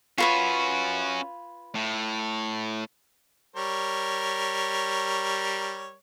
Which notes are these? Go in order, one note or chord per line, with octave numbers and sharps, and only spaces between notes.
C#4 F4 F#4 B4 C#5
A2
G3 A#4 C#5